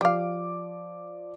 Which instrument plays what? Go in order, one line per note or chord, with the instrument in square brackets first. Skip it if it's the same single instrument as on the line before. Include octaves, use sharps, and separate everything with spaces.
[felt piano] F3 D5 D6 [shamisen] G4 F5